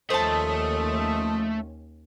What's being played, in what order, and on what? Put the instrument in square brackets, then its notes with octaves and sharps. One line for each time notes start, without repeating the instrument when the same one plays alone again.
[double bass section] D#2 C#4 [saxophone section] F3 D#5 [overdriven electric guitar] A3 [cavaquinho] C5 A5